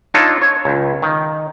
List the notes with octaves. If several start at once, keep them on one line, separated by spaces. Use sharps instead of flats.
D4 D#4 F4 A4 C#5
C#5
C#2
D#3